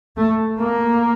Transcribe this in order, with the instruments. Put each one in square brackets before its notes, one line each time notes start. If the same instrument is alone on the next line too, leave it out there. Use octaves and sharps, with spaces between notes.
[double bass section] A3
A#3